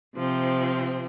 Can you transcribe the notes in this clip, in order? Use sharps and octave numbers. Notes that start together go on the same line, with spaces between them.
C3 F3 C4